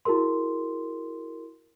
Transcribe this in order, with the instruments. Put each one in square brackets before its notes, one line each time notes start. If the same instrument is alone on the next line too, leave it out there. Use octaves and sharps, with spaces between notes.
[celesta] E4 F#4 G#4 A#4 C6